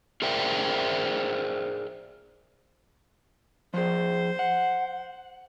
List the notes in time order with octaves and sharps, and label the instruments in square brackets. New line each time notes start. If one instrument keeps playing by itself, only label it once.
[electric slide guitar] G#4 A#4 C5 D5 E5 G5
[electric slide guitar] F3 G#4 [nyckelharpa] C5
[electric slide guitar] F#5